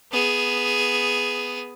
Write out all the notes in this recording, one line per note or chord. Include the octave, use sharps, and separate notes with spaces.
B3 G#4